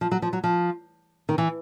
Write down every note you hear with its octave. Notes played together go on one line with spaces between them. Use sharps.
F3
F#3
F3
F#3
F3
D#3
E3